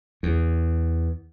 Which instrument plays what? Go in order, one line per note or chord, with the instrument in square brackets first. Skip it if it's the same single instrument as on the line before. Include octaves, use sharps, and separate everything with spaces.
[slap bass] E2